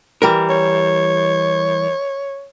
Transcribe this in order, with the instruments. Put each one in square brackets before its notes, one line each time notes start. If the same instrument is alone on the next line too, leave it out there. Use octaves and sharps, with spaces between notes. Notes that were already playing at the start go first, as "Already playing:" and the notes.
[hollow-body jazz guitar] E3 G3 A#4
[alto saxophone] C#5